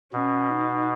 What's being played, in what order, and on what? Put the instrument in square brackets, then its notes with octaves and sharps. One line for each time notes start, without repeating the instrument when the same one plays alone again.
[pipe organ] B2 [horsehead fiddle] C#4
[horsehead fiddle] D#4